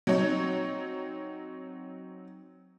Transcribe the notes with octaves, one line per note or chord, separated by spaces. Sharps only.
F#3 C4 D#4 C#5